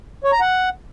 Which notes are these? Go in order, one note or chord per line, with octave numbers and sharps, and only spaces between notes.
C#5
A#5
F#5